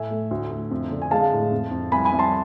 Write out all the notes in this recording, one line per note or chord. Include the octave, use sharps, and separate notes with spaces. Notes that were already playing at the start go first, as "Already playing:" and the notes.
Already playing: A2 A3 E5 G#5
A3
D2
D2
F2
D3
G#5
G#3 F5 A5
A2
F2
F2
C2 G#5 B5
G#5 B5
C2
A5 C6